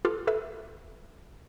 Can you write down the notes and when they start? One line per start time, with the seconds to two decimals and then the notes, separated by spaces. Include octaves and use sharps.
0.05 F4 G4 A4 B4
0.27 A4 B4 E5